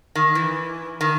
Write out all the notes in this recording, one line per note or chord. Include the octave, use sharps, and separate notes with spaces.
D#3
E3
D#3